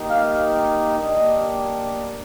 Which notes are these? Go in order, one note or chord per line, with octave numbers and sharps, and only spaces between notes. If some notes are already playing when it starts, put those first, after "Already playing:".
Already playing: A#3 D#4 G4
F5
A#3 D4 G4 D#5